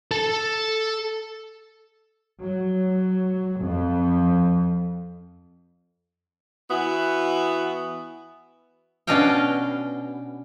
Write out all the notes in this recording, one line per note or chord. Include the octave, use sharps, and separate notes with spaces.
A4 A5
F#3
F2
E3 B3 E4 F#4
B2 C#4 D4 D#5 F5 G5